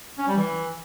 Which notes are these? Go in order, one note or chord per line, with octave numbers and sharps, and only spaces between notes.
C#4
G3
E3